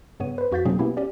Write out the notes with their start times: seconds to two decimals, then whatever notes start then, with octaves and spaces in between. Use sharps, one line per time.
0.20 G2 C#3 B3 C#5 D#7
0.38 B4 C5
0.52 F2 F#4 F5 G6 A6 B6
0.65 B2 F#3 A#3 C4 D4 G#4
0.79 B2 A#3 B3 C#4 E4 G4
0.97 C#4 G4 D5